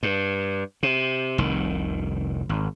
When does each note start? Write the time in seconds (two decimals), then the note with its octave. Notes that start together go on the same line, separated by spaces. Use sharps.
0.03 G2
0.83 C3
1.38 F1 C2 D#3
2.49 G#1